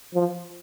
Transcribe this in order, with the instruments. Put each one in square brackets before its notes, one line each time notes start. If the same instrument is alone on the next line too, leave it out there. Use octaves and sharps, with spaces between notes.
[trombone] F3